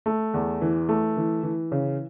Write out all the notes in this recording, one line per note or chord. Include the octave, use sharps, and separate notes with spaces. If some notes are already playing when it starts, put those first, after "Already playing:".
A3
E2
E3
A3
E3
E3
C#3